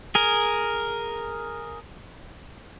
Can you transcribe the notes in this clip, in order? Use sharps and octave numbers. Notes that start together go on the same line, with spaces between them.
G#4 A#4